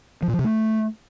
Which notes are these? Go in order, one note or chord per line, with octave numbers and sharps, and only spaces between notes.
F3
A#2
F3
C3
A3